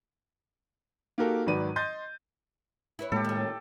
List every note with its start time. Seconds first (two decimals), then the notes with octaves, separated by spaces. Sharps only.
1.18 A#3 D#4 F#4 G4 A4 A#4
1.46 G#1 D#3 F#3 B4 D5 D#7
1.76 D#5 C6 G6 A6
2.99 E4 B4 C#5
3.12 A2 G#3 A#3 G4 A4
3.24 D#3 C#4